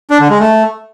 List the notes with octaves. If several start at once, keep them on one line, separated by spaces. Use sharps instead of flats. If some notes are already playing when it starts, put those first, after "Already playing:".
D4
D3
G#3
A3